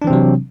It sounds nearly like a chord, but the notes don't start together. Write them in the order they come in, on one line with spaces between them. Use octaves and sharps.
D4 E3 C4 C3 F#3